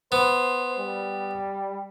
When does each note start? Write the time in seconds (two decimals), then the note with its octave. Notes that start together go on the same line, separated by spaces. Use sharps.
0.12 B3 C5
0.79 G3